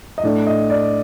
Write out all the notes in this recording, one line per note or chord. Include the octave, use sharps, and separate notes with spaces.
D#5
A2 A3 D4 D5
D#5
D5